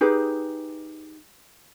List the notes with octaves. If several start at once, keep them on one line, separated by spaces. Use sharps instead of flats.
D#4 G4 G#4 B4